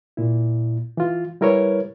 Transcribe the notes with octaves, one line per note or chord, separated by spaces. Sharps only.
A#2 E4
E3 F4
G3 E4 A#4 B4 C#5